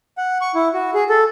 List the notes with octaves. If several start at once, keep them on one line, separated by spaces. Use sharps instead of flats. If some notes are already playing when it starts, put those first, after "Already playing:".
F#5
C#6
E4
F#4
G#4
A4